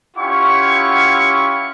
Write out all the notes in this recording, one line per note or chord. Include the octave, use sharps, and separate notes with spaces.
C#4 E4 F4 G4 F#5 C#6